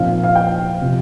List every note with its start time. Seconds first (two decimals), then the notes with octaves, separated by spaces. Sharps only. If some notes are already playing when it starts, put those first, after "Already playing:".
Already playing: A#2 F3 C4 D#4 F5
0.24 F5
0.35 G5
0.81 C3 F3